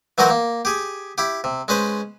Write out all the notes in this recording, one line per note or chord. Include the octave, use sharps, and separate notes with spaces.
E3 F#3 D#4 F#4 A#4 C5
A#3
G4 G#4
E4 G4
C3
G#3 C#4 B4 C5